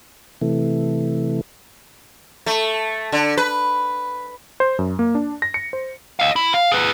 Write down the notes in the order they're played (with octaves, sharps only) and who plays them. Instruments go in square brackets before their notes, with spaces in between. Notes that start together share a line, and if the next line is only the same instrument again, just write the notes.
[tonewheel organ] C3 E3 A3
[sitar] A3
D3
B4
[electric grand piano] C5
F#2
A#3
D4
A#6
C#7
C5
[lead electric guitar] D#5 F5
E4
F5
G#4 B4